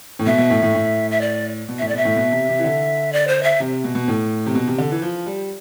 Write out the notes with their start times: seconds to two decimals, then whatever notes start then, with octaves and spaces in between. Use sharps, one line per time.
0.19 A2
0.26 B2 E5
0.38 B2
0.50 A2
0.62 A2
0.74 A2
1.11 E5
1.21 D5
1.69 B2
1.79 A2 E5
1.88 D5
1.94 B2 E5
2.05 A2
2.16 B2
2.32 C3
2.49 C3
2.59 E3
2.64 D3
3.13 D5
3.28 C5
3.43 E5
3.60 C3
3.84 B2
3.95 B2
4.08 A2
4.46 C3
4.55 B2
4.67 C3
4.78 D3
4.91 E3
5.02 F3
5.26 G3